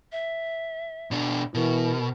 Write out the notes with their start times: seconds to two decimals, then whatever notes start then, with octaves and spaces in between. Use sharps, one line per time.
0.12 E5
1.11 B2 D4
1.55 B2 E3 A#4